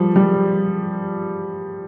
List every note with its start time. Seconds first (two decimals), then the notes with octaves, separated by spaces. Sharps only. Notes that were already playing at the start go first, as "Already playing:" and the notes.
Already playing: F3 G3
0.16 G3